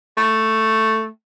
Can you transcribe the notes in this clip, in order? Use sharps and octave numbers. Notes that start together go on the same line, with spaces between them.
A3